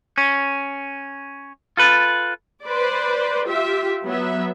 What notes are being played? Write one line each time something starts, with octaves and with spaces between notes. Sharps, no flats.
C#4
F4 A4 B4
B4 C5 D5
F4 G4 E5
F#3 B3 E5